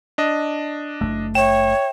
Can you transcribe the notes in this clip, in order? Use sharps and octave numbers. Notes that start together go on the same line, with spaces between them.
D4 D#5
F#1 F2 A3
C#5 E5 G5 E7